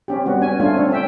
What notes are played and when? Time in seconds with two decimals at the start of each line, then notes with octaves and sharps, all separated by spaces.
0.08 C4 C#4 G4
0.26 G3 B3 F#4
0.42 C#4 G#5
0.60 A3 D4 F4 G#5
0.75 C4 D4 C#5
0.90 C#4 E5 G5